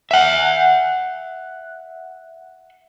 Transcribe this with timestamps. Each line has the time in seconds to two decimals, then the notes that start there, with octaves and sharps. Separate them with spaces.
0.11 E5 F#5